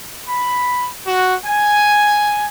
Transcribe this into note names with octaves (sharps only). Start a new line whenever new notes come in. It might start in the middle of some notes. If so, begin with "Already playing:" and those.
B5
F#4
G#5